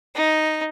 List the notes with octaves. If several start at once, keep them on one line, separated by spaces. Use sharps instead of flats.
D#4